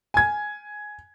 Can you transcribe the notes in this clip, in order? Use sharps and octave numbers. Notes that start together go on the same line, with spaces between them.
G#5 G#6